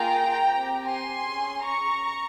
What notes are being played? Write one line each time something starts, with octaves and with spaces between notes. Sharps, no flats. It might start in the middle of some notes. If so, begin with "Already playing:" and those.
Already playing: A#3 F4 G#4 G5 A#5
C4 G4
G#5 C6
C#4 G#4
A#5 C#6